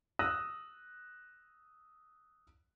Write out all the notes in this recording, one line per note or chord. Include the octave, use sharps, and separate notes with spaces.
D#6 E6 F#6 A#6 D#7